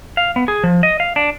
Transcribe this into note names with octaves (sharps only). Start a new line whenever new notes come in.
F5
B3
G#4
F3
D#5
F5
D4